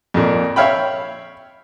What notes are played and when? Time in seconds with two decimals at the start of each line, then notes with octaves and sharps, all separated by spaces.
0.14 F2 A#2
0.56 C#5 E5 F5 G5 B5